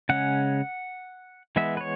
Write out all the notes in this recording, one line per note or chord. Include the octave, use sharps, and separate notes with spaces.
C#3 G#3 C#4 F#5
E3 G#3 B3 E5
B4
C#5